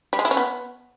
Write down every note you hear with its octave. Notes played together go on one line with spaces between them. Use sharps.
G3
G#3
E4
C#4
B3